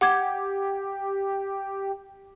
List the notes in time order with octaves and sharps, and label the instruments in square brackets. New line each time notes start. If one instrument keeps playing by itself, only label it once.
[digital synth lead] G4 [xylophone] F#5 D6 G#6